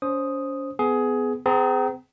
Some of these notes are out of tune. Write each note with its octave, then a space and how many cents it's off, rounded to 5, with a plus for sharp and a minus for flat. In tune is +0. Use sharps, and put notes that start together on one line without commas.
C#4 +40 C5 +15 D#6 +0
B3 +25 G#4 +15
C4 -40 G#4 +0 A#5 +0